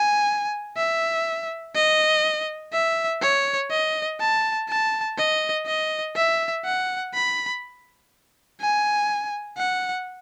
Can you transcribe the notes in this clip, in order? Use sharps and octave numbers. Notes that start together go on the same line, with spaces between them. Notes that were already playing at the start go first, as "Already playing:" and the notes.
Already playing: G#5
E5
D#5
E5
C#5
D#5
A5
A5
D#5
D#5
E5
F#5
B5
G#5
F#5